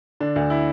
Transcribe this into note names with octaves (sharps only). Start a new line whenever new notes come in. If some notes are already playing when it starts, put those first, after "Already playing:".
D3 D4
D2
E4